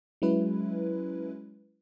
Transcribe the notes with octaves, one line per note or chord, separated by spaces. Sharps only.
F#3 G#3 C#4 E4 B4